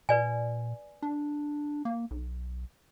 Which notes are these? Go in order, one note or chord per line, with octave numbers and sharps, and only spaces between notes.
A#2 B4 D5 G#5
D4
A#3
B1